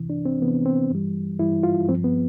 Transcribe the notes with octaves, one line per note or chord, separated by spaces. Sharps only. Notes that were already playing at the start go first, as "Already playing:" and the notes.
Already playing: C2 C3 E3
D4
C4
C2 C3 E3 B3
C4
G2 E3 G3
G2 E3 G3 E4
F4
G2 F3 C4
B3